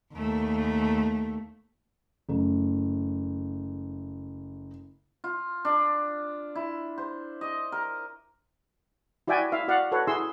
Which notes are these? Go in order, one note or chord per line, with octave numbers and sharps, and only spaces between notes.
D#2 A3
F#1 A3
F4
D4
E4
C5
D#5
A#4
E4 F#4 D5 E5 G5 G#5
E4 E5 F5
F#4 D5 F5 F#5
F#4 A4 B4 C#5 F#5
E4 G#4 C6 E6